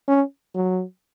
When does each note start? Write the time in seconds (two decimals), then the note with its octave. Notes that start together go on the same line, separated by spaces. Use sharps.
0.08 C#4
0.55 F#3